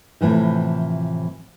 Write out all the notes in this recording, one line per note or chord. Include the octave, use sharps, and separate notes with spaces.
A2 C3 E3 F3